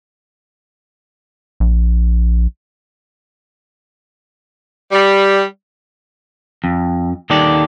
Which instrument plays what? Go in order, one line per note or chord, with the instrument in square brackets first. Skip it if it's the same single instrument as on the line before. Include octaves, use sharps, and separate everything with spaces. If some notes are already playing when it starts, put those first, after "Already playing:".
[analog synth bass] A#1
[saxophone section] G3
[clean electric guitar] F2
D#2 D#3 G4 A4 D5